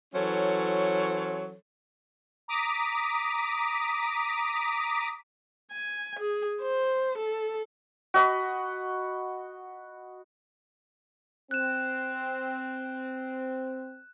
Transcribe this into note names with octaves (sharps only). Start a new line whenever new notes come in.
E3 F#3 C#4 A4 C5 C#5
A#5 D6 D#6 B6
G#5
G#4
C5
A4
F#4 D#5 B5
C4 F#6 E7